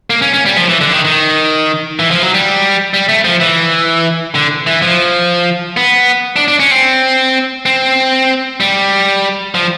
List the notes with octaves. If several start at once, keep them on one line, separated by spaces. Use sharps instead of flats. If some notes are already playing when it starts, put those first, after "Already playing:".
A#3
C#4
C#4
G3
F3
E3
D3
D#3
D#3
E3
F3
F#3
G3
G3
A3
F3
E3
D3
E3
F3
B3
D4
D4
C#4
C4
C4
G3
F3